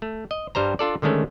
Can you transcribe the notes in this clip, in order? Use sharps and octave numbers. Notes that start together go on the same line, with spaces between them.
A3
D#5
G2 G3 C5 A#5
D4 F4 A4 D5
D3 D#3 G#3 A3 C#4